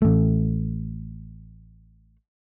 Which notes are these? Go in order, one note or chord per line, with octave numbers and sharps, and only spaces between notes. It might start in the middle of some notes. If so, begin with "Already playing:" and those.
A1 A3